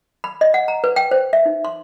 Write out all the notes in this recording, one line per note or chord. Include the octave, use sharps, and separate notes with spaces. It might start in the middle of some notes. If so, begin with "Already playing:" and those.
B5
D#5
F#5
A#5
B4
G5
C5
E5
D#4
C6